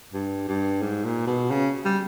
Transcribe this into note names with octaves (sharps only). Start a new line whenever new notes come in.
G2
G2
G#2
A#2
B2
C#3
G3